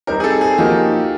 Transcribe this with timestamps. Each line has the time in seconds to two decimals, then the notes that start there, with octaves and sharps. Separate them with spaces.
0.07 G3 C4 D#4 G4 A#4 C5
0.20 G#4
0.24 A4
0.41 G#4
0.58 F3 A#3 D#4 F#4 G4 A#4